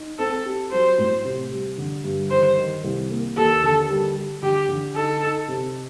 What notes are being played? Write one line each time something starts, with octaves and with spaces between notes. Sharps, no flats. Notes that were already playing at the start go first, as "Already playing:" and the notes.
Already playing: D#4
C4 A4
G4
F#3 C5
A2
C3
G3
D3
G2
D#3 C5
D#3
C2
A#3
D#2 A4
D3
G3
G3
D3 G4
D3
D#4 A4
D#4
C3